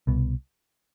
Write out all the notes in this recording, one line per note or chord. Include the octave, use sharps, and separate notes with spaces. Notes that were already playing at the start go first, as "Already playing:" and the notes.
C2 B2